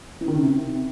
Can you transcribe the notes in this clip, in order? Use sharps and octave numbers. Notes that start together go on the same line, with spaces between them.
E3
D#3
C#3
C3